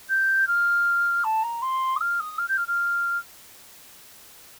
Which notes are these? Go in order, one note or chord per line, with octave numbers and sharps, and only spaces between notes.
G6
F6
A5
A#5
C6
D#6
F6
D#6
F6
G6
F6
F6